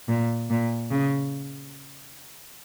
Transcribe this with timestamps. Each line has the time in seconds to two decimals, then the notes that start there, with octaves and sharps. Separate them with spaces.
0.08 A#2
0.50 A#2
0.91 C#3